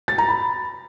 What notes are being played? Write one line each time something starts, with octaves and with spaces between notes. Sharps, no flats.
A6
A#5
B5